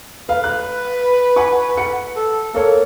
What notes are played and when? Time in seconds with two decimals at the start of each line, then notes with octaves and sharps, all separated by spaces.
0.29 B4 F5
0.44 F#6
1.36 F#5 G#5 C#6
1.77 F#5 C#7
2.16 A4
2.54 A#3 A4 C#5